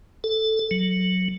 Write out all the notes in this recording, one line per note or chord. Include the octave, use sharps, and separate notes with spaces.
A4
F#3